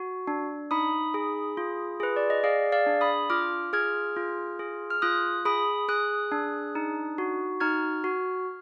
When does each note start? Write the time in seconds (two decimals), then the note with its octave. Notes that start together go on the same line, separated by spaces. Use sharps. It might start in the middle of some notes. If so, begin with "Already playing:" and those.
Already playing: F#4
0.27 D4
0.71 D#4 B5 D#6
1.14 G#4
1.57 F4
2.00 G#4 B4
2.16 D5
2.30 D#5
2.44 G#4 D5 F5
2.72 D5 F5
2.86 D4
3.01 B5 D#6
3.30 F4 D6 F6
3.73 G#4 F6 G#6
4.16 F4
4.59 G#4
4.90 F6
5.02 F4 D#6 F#6
5.45 G#4 B5 D#6
5.88 G#4 D#6 F#6
6.32 D4
6.75 D#4
7.18 F#4
7.60 D#4 F6 G#6
8.04 F#4